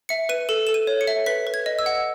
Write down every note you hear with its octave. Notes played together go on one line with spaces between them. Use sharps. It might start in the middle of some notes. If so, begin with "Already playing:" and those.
E5 C#7
B4 D#7
A4 E7
A4 E7
D#7
C#5
C#7
E5
B4 B6
B4
G#6
D#5
E6
F#5